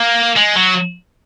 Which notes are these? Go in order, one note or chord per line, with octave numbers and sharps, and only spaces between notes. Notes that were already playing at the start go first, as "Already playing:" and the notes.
Already playing: A#3
G#3
F#3